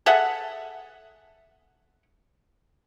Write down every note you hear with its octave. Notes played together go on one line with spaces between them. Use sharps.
G#4 A4 E5 F#5